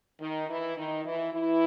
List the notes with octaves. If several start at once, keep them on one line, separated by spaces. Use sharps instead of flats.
D#3 D#4
E3 E4
D#3 D#4
E3 E4
E3 E4